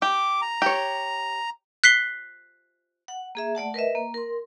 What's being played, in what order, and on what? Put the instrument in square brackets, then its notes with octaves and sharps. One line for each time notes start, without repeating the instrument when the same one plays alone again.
[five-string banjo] G4 [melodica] D6
[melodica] A#5
[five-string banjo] G4 C#5
[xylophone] F#6 B6 C7 G7
[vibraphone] F#5
A#3 G#4 E5
A3 D5 F#5 A5
A#4 B4 D#5 E5
A#3
A#4 C6